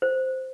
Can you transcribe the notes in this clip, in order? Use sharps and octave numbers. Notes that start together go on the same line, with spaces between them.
C5